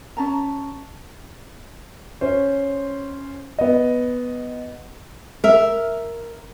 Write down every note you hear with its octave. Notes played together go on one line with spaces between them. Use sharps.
C#4 A5 A#5
C#4 C5
B3 D#5
A#4 E5